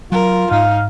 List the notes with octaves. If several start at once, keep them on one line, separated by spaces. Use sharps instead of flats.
F#3 F4 A#4
G#2 D#4 F5